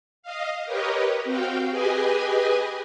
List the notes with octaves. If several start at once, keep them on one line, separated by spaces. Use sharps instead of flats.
D#5 F5
G4 A#4 B4 C#5 D#5
C4 F#4 F5 G5
G4 G#4 B4 D#5 G#5